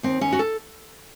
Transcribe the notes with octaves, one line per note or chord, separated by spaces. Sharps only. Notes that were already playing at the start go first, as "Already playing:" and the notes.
D#2 C4
D#2 C#4
F#4
A4